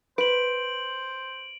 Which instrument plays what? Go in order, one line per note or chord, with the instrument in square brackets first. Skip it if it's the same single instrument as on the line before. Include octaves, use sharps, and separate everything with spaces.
[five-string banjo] B4 [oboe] C5 [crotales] D7 F#7